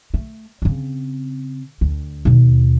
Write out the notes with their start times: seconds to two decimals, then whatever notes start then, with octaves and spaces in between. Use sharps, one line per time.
0.14 A3
0.62 C#3 C4
1.81 D2
2.25 D#2 B2